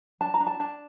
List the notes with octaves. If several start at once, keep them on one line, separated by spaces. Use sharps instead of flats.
D4 A5
A#5
D4
A5
D4 A5